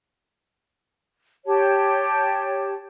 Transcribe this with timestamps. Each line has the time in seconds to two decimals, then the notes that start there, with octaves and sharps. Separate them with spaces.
1.46 G4 C#5 A5